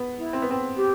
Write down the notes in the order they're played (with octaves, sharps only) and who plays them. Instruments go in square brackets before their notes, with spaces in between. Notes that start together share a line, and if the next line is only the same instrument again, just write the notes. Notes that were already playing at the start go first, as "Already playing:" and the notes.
Already playing: [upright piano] B3
[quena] E4
[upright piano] C4
B3
C4
[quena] G4